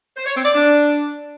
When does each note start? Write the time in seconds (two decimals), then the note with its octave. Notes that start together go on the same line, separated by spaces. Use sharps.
0.17 C5
0.26 C#5
0.35 C4
0.45 D5
0.54 D4